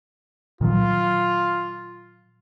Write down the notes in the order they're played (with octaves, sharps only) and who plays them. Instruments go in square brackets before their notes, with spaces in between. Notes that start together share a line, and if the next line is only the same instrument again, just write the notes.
[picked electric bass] A#2 D#3 F#3 [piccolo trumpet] F4